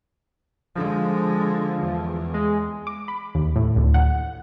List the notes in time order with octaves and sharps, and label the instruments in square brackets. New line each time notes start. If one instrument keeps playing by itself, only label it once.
[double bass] D3 G#3 [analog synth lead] F3
[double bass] E2
[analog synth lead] G#3
[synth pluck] D6
B5
D#2
A2
D2
F#5